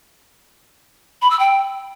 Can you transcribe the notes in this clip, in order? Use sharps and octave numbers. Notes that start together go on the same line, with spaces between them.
B5
E6
G5